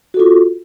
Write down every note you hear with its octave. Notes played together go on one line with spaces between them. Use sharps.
F4 F#4 A4